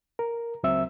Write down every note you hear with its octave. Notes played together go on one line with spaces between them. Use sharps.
A#4
C#2 F#3 C4 E5 E6